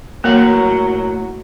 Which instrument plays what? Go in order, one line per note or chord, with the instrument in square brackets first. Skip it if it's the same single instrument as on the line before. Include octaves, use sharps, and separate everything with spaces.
[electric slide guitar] A2 A#4 F#5 [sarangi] F#3 [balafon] A#3